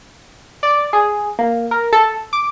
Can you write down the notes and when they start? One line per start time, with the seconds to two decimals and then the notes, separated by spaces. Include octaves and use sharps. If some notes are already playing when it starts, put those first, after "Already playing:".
0.63 D5
0.93 G#4
1.39 A#3
1.71 A#4
1.93 A4
2.33 D6